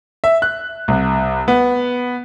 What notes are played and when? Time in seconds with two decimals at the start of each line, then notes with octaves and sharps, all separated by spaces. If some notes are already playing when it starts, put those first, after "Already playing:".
0.24 E5
0.42 F#6
0.88 C2
1.48 B3